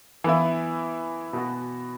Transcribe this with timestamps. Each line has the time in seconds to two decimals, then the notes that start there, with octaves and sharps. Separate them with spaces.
0.24 E3 B3 E4
1.33 B2 B3 F#4